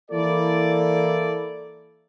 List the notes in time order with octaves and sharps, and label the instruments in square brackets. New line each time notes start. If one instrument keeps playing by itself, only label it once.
[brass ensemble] E3 A#3 E4 A4 D5